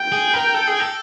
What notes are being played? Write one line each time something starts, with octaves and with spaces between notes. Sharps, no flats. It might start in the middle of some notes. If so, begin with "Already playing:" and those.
Already playing: G5
G#4
A#4
A4
G#4
A4